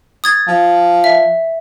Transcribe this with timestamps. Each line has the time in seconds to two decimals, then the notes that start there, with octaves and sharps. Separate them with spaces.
0.24 D#6 G#6 A6
0.48 F3
1.04 E5